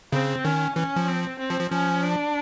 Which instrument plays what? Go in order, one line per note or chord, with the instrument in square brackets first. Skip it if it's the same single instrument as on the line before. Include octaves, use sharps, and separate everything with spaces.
[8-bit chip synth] C#3 [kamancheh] C4
[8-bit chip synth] D#3 [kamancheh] C#4
[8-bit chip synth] E3 [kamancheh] C#4
[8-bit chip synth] F3
[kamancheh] C4
C4
[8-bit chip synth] F3
F3
[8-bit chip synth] F3 [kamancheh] C#4
[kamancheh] D4